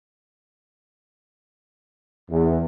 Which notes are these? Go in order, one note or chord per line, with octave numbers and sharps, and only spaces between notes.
E2